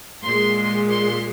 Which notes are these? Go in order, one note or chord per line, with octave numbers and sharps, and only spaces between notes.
A#2 G#3 C6
C6